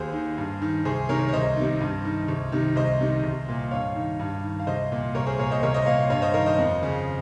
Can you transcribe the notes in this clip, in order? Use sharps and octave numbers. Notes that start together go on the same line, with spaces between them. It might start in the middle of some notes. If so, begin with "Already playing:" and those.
Already playing: D#2 G#4 C5
D#3
G2
D#3
C2 G#4 C5
C3 D#3 A#4 C#5
C#5
C2 C5 D#5
C3 D#3
G2
D#3
C2
C3 D#3
C2 C5 D#5
C3 D#3
C2
A#2
G2 C#5 F5
D#3
G2
D#3
F5
C2 C5 D#5
A#2
C2 A#4 C#5
G#4 C5
A#2 A#4 C#5
C5 D#5
C2 A#4 C#5
C5 D#5
A#2 C#5 F5
G2 C#5 F5
C5 D#5
D#3 A#4 C#5
C5 D#5
F2
C#3